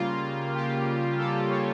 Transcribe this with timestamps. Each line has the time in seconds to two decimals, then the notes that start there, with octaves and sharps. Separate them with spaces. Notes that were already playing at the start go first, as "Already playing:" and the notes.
Already playing: C#3 G3 A#3 F4
0.55 G4
1.18 A4
1.50 C#5